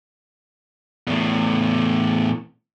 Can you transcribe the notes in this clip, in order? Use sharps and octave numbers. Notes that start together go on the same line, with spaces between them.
E2 A2